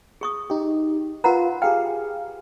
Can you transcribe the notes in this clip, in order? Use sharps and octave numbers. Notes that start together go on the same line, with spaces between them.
G#4 C#6 D#6
D#4 G4
F4 A#4 B4 F#5 A#5
G4 G#4 F5 G5